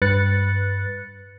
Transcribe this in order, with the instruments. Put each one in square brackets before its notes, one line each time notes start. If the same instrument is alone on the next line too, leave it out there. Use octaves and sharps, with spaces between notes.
[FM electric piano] G2 B4 F#6 A6 C#7